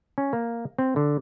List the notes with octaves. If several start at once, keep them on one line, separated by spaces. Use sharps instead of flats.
C#4
A#3
C4
D3